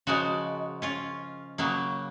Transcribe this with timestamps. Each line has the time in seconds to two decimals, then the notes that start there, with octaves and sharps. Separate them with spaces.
0.07 C#3 F3 G#3 F#4 A#4
0.82 C#4 F4
1.58 C#3 F#3 A#3